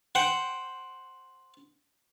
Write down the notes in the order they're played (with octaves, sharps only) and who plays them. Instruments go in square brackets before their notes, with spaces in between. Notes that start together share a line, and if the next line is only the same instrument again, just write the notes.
[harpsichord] C5 F#5 G5